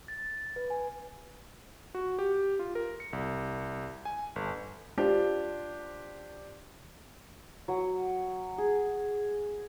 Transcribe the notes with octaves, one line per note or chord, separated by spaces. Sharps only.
A6
B4
G#5
F#4
G4
F4
A#4
C#7
C2
G#5
G1
D4 F4 G4 C5
F#3
G#4